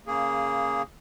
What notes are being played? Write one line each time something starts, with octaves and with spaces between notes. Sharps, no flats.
C#3 A#3 G#4